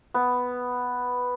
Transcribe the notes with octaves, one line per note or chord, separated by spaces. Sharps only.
B3